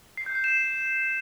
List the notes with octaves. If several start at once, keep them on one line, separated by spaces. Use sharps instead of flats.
C7
G6
C7
E7